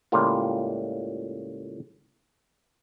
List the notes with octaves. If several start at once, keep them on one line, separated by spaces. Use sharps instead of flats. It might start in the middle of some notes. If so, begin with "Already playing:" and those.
C#2 A2 G3 A#3 F4